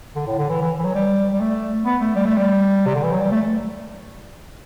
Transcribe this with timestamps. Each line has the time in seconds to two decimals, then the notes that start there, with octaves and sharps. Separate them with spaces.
0.15 D3
0.27 A2
0.38 D3
0.49 E3
0.62 E3
0.79 E3
0.84 F#3
0.94 G3
1.33 G3
1.40 A3
1.85 B3
2.00 A3
2.16 G3
2.26 A3
2.37 G3
2.86 C3
2.95 D3
3.03 E3
3.12 F#3
3.20 G3
3.32 A3